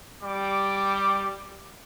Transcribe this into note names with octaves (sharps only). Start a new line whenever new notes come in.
G3 D6